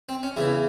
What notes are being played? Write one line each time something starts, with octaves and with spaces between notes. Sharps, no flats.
C4
C#4
E2 C#3 E3 E4